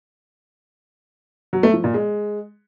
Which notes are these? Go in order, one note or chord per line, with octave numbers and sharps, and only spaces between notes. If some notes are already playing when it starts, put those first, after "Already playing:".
F#3
A3
F3
A#2
G#3